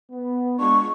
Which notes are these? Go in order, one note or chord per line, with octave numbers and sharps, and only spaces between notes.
B3
G#3 D4 F4 C#6